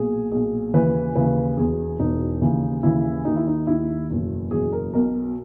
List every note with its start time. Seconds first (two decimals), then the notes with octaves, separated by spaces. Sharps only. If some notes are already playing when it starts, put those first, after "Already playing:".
Already playing: B1 A#2 G#4
0.31 B1 A#2 G#4
0.74 D#2 C#3 E3 B4
1.15 D#2 C#3 E3 B4
1.57 E1 E2 B2 G#4
1.99 E1 E2 B2 D#4
2.41 D#2 C#3 E3
2.83 D#2 C#3 E3 E4
3.25 D#2 D#3 D#4
3.36 E4
3.47 D#4
3.67 D#2 D#3 E4
4.10 F#1 E2 B2
4.51 F#1 E2 B2 G#4
4.72 A#4
4.93 B1 B2 A#4